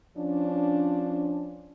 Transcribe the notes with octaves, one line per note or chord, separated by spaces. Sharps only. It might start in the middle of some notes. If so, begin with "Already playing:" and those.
F3 C#4 D4